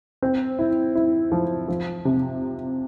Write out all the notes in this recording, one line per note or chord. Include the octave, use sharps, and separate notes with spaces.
C4
E4
E4
F3
F3
C3